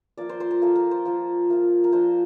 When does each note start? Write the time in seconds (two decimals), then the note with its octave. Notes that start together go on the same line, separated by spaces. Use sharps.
0.17 F3 A#3 F4 D5
0.29 C5
0.40 C5
0.51 A#4
0.62 F3 A#3 F4 A4
0.76 A#4
0.91 C5
1.05 F3 A#3 F4
1.50 F3 A#3 F4
1.84 A#4
1.92 F3 A#3 D4 C5